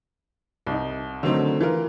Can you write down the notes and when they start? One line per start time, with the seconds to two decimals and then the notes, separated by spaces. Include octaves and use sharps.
0.67 C2 D#4
1.23 D3 D#3 F#3 A3 C4 D#4
1.61 E3 F4 A#4